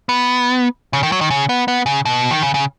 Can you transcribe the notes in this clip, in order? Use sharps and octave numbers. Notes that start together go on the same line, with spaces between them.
B3
C#3
D#3
F#3
D#3
C#3
B3
B3
C#3
B2
D#3
C#3
C#3